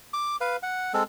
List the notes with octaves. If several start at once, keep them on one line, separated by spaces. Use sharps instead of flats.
D6
B4 F5
F#5
G#3 C4 A4